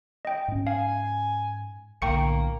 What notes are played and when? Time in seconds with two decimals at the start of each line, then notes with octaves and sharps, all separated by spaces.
0.25 D#5 G5
0.48 G#2 C#4
0.67 F5 G#5
2.02 B1 A2 D3 A#3 G5 C#6 C#7